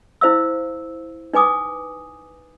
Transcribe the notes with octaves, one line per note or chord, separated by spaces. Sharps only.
E4 C5 F5 E6
D#4 B4 G#5 D6 D#6